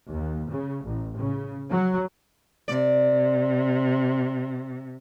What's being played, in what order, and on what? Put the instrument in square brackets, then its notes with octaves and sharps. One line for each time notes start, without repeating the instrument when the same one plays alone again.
[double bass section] D#2
C#3
A1
C#3
F#3
[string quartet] C3 [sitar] D5